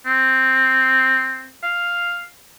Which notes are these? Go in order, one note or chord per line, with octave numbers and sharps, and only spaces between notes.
C4
F5